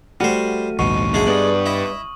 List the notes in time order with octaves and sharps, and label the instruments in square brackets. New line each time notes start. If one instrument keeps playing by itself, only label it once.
[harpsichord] G3 C5 [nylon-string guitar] A3 F#4 [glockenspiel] F6 D#7
[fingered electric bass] A#1 D#2 G#2 [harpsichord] B2 [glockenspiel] C#6 D#7
[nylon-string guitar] D3 F#3 [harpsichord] G#3 A3 G#4
[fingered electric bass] G2 [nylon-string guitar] B3 D5 [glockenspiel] D#6 F#7
[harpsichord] E4 D#5